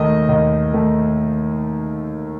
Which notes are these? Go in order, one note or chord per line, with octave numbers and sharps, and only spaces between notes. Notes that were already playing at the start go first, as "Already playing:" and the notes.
Already playing: D#2 D#3 A3 D#5
D#2 D#5
D#3 A3